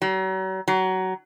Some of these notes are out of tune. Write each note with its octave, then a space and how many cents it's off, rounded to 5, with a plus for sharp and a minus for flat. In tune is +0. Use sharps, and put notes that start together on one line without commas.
F#3 +40
F#3 +20